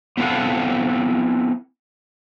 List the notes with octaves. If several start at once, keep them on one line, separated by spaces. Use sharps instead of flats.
B3 C4 E4 A4 F5 F#5